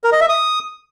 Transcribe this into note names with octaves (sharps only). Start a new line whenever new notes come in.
A#4
D#5
E5
D#6